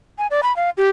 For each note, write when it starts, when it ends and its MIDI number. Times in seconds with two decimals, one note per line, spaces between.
0.18 0.27 80
0.31 0.41 74
0.43 0.55 83
0.56 0.70 77
0.77 0.90 67